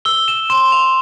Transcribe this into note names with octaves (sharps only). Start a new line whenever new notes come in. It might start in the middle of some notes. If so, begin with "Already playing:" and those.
E6 G7
E7
C6 E7
F7